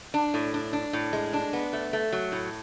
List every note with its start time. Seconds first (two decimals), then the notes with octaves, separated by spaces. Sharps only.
0.14 D4
0.34 A2
0.54 D4
0.73 D4
0.93 A2
1.13 G#3
1.33 D4
1.53 B3
1.73 A3
1.93 A3
2.12 F#3
2.32 A2